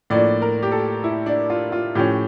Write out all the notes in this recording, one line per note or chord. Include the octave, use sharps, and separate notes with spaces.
A2 F3 A#3 D4 D5
A#4
G4
A4
E4
D4
F4
F4
A2 F3 C#4 G4